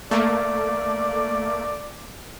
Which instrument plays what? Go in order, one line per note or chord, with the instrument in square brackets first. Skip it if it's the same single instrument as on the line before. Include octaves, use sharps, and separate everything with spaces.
[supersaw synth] A3 A#3 [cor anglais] D5